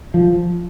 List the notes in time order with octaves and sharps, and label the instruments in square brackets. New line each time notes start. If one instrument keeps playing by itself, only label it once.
[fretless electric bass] F3